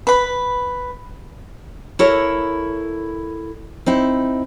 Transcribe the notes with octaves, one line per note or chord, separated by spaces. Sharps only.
B4 B5
E4 A4 A#4 C#5
C4 D#4 E4